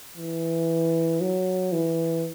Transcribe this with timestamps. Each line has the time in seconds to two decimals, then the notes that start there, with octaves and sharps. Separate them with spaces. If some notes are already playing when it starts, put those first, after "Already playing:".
0.17 E3
1.21 F#3
1.73 E3